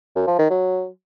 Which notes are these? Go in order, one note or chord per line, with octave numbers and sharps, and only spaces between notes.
F#2
F3
D#3
F#3